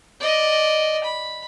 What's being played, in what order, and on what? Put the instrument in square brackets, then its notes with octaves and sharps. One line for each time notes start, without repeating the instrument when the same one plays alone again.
[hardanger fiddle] D5 D#5
B5